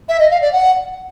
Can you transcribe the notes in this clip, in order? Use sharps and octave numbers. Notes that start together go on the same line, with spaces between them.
E5
D#5
F5
D5
F#5